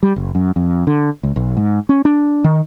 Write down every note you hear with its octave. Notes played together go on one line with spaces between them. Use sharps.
G3
F#1
F#2
F2
D3
C#2
B1
G#2
C#4
D4
D#3